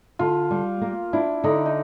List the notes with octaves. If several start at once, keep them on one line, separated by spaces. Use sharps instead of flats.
D3 F4
G3
A#3
D4 E4
D3 D#4
D#4